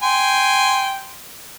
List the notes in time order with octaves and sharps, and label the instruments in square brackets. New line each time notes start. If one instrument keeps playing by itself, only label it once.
[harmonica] G5 G#5 C6